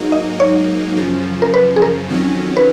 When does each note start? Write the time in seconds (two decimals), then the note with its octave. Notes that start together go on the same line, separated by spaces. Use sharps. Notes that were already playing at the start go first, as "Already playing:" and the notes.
Already playing: G#2 F#3 A#3 D#4
0.12 D#5
0.40 C#5
0.97 F#2 C#3 F3
1.42 A#4
1.54 B4
1.76 G#4
1.82 A#4
2.09 F2 D#3 F#3 C#4
2.57 B4